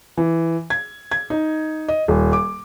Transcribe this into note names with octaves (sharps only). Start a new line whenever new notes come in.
E3
G#6
G#6
D#4
D#5
D#1
D6